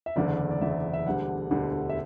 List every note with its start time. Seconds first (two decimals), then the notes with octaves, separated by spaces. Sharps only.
0.06 E5
0.16 F#1 E2 D3 D5
0.51 D5
0.61 F#1 E2 D3 E5
0.93 E5
1.06 E1 D2 D3 G3 F#5
1.51 E1 D2 D3 G3
1.89 E5